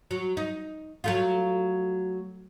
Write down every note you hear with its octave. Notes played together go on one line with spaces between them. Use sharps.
F#3
D#4
F#3 A3 F4